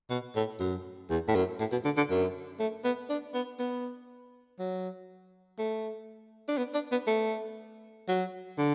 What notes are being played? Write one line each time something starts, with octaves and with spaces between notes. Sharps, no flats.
B2
A2
F#2
E2
A2
F#2
A2
B2
D3
D3
F#2
A3
B3
D4
B3
B3
F#3
A3
D4
B3
D4
B3
A3
F#3
D3